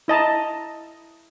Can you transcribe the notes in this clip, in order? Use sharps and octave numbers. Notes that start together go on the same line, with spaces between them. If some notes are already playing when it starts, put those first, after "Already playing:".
E4 D#5 A5 A#5